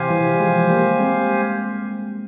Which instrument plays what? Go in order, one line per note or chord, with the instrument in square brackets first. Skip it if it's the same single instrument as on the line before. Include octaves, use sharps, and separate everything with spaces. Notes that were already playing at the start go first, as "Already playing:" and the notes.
Already playing: [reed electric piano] C3 E3 [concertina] G4 C5 F5 G#5
[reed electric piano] E3 G3
G3
F3 G#3
G3 A#3
G#3 C4